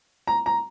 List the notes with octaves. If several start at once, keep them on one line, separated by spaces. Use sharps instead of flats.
A#5
A#5